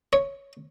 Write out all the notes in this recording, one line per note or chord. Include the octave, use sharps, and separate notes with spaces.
C#5